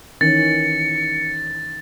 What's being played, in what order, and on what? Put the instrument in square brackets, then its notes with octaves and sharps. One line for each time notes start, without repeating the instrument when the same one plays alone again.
[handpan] D#3 E3 C#4 [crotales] A6 [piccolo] C#7